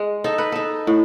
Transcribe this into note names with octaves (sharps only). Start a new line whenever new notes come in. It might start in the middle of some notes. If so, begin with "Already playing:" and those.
Already playing: G#3
D#4 A4
B4
D#4 A4
A2